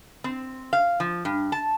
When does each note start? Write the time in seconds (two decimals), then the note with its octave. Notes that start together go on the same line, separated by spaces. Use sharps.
0.24 C4
0.73 F5
1.00 F3
1.25 G2
1.52 A5